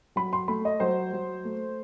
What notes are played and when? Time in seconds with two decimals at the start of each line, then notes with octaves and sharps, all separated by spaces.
0.16 F#3 B5
0.33 C6
0.48 A3 B5
0.65 D#5
0.80 F#3 C5
1.13 F#3
1.44 A3